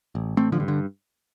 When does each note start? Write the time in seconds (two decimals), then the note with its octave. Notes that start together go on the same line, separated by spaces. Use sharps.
0.15 A1
0.37 A1 A3 C4
0.52 D3 F3
0.60 G2
0.68 D3